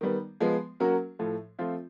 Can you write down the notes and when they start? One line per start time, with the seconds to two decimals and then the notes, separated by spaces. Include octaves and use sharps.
0.01 D#3 G3 B3
0.41 F3 G#3 B3
0.80 F#3 A#3 C#4 F#4 A#4
1.19 A2 F3 A3
1.59 F3 A3 C4 F4